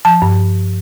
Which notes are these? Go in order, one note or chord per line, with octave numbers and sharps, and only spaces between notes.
F3 A5
G2